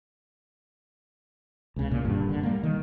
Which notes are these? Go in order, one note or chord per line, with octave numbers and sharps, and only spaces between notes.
C#2 C#3
A#2 C#3
D#1 G2 A#2 D3
D3
G3 A#3
D#3